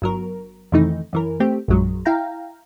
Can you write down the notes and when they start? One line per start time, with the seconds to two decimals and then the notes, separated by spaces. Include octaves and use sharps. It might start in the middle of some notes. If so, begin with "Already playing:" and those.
0.02 G1 F#3 A#4
0.72 F2 C3 D#3 E3 A3 D#4
1.13 F#2 E3 A#4
1.40 A3 C4 G4
1.68 A#1 F#2 F#3 G#3
2.05 E4 F5 G5 A#5